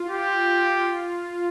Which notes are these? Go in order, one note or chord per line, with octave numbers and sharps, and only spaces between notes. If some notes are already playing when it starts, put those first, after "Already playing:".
Already playing: F4
G4